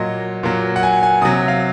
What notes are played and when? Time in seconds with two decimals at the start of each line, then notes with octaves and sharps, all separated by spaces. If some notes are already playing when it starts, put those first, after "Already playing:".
Already playing: A#2 F#3 D#5
0.43 A#2 F#3
0.76 F#5
0.83 G#5
1.03 G#5
1.21 C3 D#6
1.25 F#3
1.48 F5